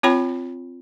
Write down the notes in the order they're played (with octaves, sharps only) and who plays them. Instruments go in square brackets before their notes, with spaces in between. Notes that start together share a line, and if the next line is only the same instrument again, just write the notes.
[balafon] C4 F4 C#5 G5 B5